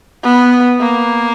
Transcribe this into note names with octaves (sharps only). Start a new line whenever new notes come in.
B3
A#3